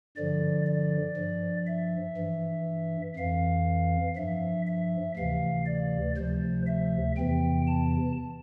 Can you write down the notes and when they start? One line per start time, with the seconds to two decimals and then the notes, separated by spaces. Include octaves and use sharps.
0.17 G2 D3 F3 D5
0.67 D5
1.17 G2 F3
1.67 E5
2.17 G2 E3
3.17 F2 E3 F5
4.16 G2 F3 E5
4.67 E5
5.17 D2 C3 E3 F5
5.66 D5
6.17 D2 C3 F3 C5
6.67 E5
7.16 E2 C3 E3 G5
7.67 A5